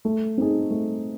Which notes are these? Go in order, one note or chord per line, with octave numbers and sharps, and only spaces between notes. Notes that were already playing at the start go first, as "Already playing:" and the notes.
A3
C4 D#4 G#4
A3